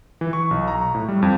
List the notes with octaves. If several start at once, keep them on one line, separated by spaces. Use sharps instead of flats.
E3
C#6
B1
A#5
A2
G3
F2